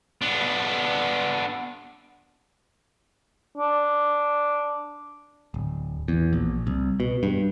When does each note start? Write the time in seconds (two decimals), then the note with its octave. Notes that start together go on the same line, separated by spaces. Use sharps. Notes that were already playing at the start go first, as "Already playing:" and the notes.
0.21 B3 D4
3.57 D4
5.54 D1
6.08 E2
6.33 A#1
6.67 C2
7.00 B2
7.23 G2